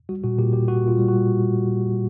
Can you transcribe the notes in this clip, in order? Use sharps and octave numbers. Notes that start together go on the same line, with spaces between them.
G3 F#4
A#2 F#4
A#2 G4
A#2 G4
A#2 F#4
A#2 F4
G3
F#4
G3